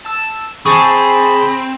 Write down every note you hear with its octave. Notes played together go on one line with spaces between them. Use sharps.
A5 E6
C4 G#4 A5 B5 C#6